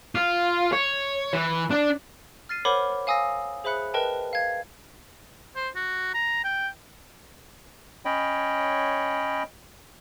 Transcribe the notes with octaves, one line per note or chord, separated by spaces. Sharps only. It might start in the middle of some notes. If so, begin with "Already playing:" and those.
F4
C#5
E3
D4
F6 A6 C7 D#7
A#4 C5 C#5 F#5 B5 D6
F5 G#5 D#6 E6 A#6
G#4 C5 E5 B5 F#6 C#7
A#4 B4 D#5 G5 A5
F5 G#6
C5
F#4
A#5
G5
C#4 C#5 D#5 G5 B5